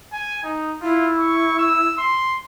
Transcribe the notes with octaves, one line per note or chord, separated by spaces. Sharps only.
G#5
D#4
E4 F4
C#6
E6
C6